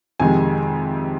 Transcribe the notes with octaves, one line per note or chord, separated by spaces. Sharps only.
F2 C3 D#3 G#3 G#5